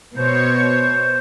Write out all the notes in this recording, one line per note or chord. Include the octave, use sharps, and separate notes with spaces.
B2 C5 C#5